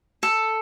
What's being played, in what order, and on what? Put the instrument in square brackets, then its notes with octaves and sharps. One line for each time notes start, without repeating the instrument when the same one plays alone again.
[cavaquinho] A4